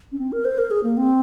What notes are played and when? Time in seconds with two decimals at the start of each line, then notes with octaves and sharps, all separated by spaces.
0.12 C#4
0.19 C4
0.32 A#4
0.45 C5
0.58 A#4
0.71 G#4
0.83 A#3
0.97 C4